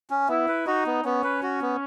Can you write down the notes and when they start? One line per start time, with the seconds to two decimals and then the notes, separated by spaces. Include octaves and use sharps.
0.10 C#4
0.29 B3 E4
0.48 B4
0.66 D#4 F#4
0.86 B3
1.05 B3 C#4
1.24 B4
1.43 F#4
1.61 B3